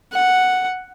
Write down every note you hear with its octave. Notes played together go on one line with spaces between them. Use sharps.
F#5